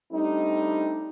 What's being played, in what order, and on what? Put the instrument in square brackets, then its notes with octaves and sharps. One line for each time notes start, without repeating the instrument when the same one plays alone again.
[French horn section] G3 A3 C4 D4 D#4